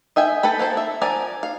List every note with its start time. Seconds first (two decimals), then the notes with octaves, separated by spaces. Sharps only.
0.16 D#5 E5 G5 G#5
0.43 A4 B4 G5 B5
0.59 A#3 A4 C5
0.77 E5
1.02 F3 A#4 D5 G#5
1.43 F5